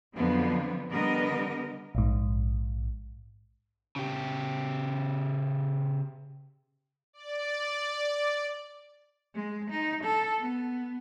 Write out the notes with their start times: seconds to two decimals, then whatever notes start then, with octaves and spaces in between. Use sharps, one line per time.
0.15 F2 D3 F3 F#3 B3 C4
0.91 D3 G3 B3 A#4 D#5
1.95 A#1 G#2
3.96 C#3 G4
7.13 D5
9.34 G#3
9.70 D#4
10.04 A4
10.40 B3